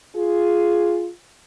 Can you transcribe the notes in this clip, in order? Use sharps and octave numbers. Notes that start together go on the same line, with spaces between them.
F4 G#4